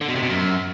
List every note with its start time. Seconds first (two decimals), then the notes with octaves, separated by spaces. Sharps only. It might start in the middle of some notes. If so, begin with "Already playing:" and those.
0.01 D3
0.08 B2
0.15 C3
0.22 B2
0.30 F#2